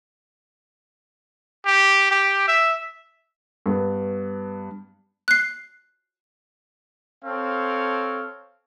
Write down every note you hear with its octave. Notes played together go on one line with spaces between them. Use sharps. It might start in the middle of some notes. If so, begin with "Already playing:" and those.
G4
G4
E5
G2 B3
F#6 C7
C4 A4 C#5 F5